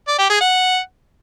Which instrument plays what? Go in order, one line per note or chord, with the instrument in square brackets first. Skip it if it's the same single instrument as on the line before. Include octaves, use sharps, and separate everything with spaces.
[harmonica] D5
G4
G#4
F#5